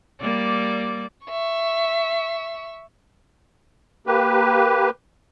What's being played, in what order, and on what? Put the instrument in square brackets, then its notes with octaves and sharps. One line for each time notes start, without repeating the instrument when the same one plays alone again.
[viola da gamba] G3 A#3 D5
[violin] E5 C#6
[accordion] A#3 G4 B4